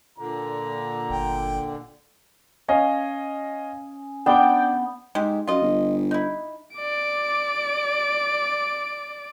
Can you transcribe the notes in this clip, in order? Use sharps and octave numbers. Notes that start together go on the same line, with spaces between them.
A#2 D3 A#5
G1 G5
C#4 C#5 D#5 F5
B3 D4 D5 G5 G7
G#2 G#3 G4
F#2 F4 D#5
G1
D#4 E4
D5 D7